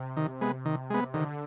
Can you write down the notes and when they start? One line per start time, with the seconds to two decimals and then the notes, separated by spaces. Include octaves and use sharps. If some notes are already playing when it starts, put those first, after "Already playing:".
Already playing: C3
0.17 D#3
0.41 G#3 B3
0.65 D#3
0.90 G#3 B3
1.14 D3 D#3
1.30 D3